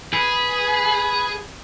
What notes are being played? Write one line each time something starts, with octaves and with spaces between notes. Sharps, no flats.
G#4 B4